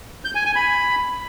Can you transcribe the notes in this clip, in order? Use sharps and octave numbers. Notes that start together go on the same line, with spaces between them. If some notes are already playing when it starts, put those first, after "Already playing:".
G6
G#5
G#5
B5